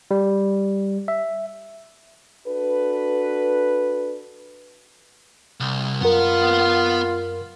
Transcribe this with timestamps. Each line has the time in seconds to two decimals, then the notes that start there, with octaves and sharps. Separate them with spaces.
0.11 G3
1.08 E5
2.47 D4 F#4 A4 B4
5.60 C2
6.01 F#2 B3 F4 A#4 F#5